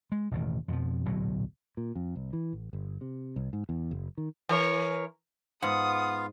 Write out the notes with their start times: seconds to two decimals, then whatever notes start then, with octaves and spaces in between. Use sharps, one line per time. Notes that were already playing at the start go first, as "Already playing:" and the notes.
0.12 G#3
0.31 E1 A1 D#3
0.68 F2 B2 F3
1.05 D1 B1 A#2 F#3
1.77 A#2
1.96 F2
2.16 C2
2.33 E3
2.53 A1
2.73 G1
3.01 C3
3.36 C2
3.53 G#2
3.69 E2
3.91 F#1
4.18 D#3
4.49 E3 A#4 C#5
5.62 G#2 B3 F4 F5 F#5 D#6